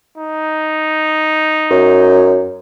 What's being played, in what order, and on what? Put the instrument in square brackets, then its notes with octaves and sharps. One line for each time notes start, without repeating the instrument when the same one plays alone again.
[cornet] D#4
[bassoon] F#2